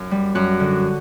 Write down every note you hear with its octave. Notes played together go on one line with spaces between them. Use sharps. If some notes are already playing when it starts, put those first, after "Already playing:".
Already playing: F#2
G3
F#2 F#4
D3